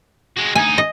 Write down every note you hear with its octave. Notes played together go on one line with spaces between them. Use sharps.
G#3 F#4
D2 D#4 G#5
D#5